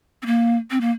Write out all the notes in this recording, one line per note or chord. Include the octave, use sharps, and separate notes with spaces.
C4
A#3
C4
A#3